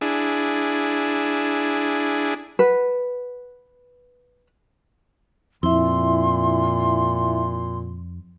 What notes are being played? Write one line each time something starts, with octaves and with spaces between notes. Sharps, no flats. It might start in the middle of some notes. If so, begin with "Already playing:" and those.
D4 E4 G#4
B4 F#5
F2 A#2 E4 E5 C6